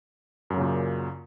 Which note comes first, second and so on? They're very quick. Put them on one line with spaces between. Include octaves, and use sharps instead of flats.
F#2 F#3 C#3 A#2